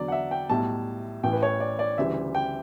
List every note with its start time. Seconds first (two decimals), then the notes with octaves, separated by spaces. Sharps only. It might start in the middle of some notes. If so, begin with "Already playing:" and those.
Already playing: E2 D3 F#3 D5
0.08 F#5
0.12 E5
0.31 G5
0.49 B1 A2 G3 A5
1.23 A1 A2 E3 G5
1.33 B4
1.43 C#5
1.60 D5
1.79 D5
1.98 D2 C#3 E3 G3 E5
2.35 G5